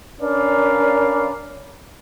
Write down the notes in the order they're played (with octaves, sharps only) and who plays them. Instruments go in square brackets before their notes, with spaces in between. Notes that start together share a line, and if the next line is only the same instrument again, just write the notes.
[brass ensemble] C#4 D4 A#4 B4 D5 F5